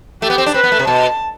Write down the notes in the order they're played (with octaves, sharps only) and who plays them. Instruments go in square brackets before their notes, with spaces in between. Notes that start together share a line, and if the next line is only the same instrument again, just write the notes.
[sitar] A3 [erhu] G4
[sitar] B3
C4
D4
[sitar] C4 [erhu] B4
[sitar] B3
A3
C3
[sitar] B2 [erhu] A5